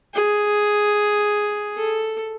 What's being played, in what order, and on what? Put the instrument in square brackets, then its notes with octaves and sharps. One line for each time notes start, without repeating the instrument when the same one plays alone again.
[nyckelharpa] G#4
A4